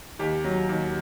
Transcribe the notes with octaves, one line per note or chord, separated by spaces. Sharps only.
D#2 G4
F#3
D#2